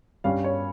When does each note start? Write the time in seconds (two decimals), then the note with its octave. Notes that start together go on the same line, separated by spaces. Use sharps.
0.24 G2 G3 C#4 F5
0.44 C#5